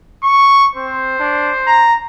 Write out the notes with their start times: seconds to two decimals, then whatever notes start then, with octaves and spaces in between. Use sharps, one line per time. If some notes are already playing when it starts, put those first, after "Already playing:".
0.24 C#6
0.76 C4 C5
1.20 D4
1.67 A#5